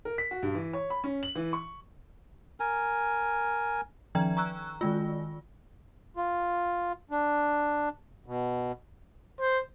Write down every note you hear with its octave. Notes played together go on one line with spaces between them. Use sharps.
A#4
B6
F#4
G2
E3
C#5
B5
C#4
F#7
E3
C#6
A#4 G#5
D#3 F3 G5 A#5 G#6
A#5 C#6 E6 F#6
D#3 G#3 F4
F4
D4
B2
C5